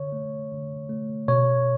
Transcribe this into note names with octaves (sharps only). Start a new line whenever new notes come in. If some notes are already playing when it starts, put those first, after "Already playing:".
Already playing: D3 C#5
A3
D3
A3
B2 C#5